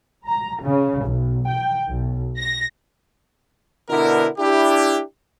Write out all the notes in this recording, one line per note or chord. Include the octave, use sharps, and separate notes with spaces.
A#5
C#3
B1
G5
B1
A#6
B2 D3 B3 D4 E4 A#4
D4 E4 G4